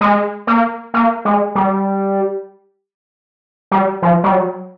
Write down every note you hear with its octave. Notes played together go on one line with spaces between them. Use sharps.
G#3
A#3
A#3
G#3
G3
G3
F3
G3
F#3